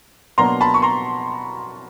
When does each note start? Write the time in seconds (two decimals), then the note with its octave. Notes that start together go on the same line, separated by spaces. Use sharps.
0.38 B2 F#3 A#3 D4 A#5 C6
0.61 A5 B5
0.74 C#6
0.82 A#5 C6